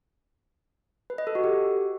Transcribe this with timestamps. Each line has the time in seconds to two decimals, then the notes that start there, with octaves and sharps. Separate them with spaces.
1.10 B4
1.18 D#5
1.27 A4
1.35 F#4
1.44 G4